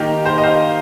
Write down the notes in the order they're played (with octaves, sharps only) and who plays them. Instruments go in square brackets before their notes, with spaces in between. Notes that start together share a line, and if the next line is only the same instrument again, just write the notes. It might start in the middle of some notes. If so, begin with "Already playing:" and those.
Already playing: [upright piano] D#3 A#3 D#4 G4
G4 C5
D#5
C5 F5